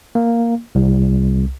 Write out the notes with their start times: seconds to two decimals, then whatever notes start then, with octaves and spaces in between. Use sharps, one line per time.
0.15 A#3
0.75 C2